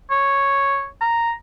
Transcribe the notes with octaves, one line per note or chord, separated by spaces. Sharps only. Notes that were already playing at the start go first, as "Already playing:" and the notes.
C#5
A#5